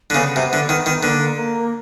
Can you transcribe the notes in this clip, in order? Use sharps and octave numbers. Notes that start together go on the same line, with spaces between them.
D3
C#3 B3
C3
D3
D#3
D#3
D3 A#3
A#3